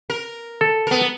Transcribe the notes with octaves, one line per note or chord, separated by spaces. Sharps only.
A#4
A4
B3 A#4